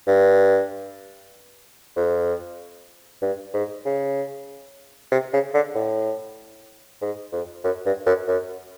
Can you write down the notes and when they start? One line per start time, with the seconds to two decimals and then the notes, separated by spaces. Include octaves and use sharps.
0.08 G2
1.96 F2
3.22 G2
3.54 G#2
3.85 C#3
5.12 C3
5.33 C#3
5.54 D3
5.75 A2
7.02 G#2
7.32 F2
7.64 F#2
7.86 G2
8.06 F#2
8.28 F#2